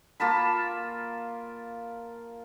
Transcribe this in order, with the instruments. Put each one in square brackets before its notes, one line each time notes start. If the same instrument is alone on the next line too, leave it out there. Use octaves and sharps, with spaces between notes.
[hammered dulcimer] A#3 F4 A5 B5